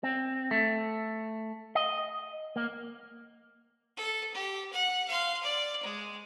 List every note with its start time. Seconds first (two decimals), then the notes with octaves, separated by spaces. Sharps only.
0.03 C4
0.51 A3
1.75 D#5
2.56 A#3
3.97 A4
4.34 G4
4.72 F#5
5.08 F5 C6
5.42 D5
5.83 G#3